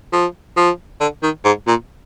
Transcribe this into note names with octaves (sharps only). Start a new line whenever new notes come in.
F3
F3
D3
D#3
G#2
A#2